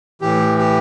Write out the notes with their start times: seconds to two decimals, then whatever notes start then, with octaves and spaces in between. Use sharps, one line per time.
0.22 A2 E3 G4
0.58 G4